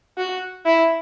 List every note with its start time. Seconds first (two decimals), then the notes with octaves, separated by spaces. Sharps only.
0.17 F#4
0.66 E4